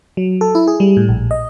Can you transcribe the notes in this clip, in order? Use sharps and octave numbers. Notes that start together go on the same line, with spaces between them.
F#3
A4
E4
G#4
G3
A2
A#1
D#5